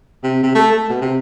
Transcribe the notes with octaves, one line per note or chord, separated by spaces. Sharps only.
C3
C3
A3
A3
B2
C3